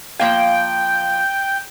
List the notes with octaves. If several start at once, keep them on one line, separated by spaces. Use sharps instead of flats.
F3 A#3 F5 G5